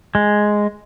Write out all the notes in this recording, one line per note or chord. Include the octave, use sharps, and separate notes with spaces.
G#3